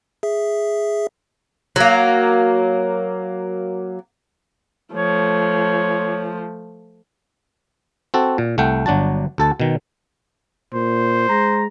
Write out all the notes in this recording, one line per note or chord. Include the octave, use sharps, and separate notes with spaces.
G#4 E5
F#3 A#3
F3 A3 C#5
C4 F#4 A4
A#2
C2 A3 F#5 G5
G1 F#3 D4 F#4 A5
D2 A4 A5
B2 D#3
A#2 C5
G#3 A#5